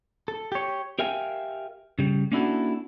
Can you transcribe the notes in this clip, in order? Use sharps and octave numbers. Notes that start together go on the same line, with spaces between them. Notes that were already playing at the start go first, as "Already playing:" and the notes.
A4
G4 C#5
G4 A#4 E5 F5 G5 G#5
C#3 G3
A#3 C#4 D4 E4 F#4 A4